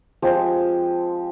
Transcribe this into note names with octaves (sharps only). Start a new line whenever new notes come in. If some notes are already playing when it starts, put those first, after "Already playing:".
F3 G#3 C4 G4